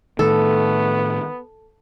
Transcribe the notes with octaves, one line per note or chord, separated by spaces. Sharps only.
A2 D#3 A3 B3 A4